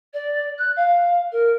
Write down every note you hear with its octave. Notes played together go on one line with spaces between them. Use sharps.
D5
F#6
F5
A#4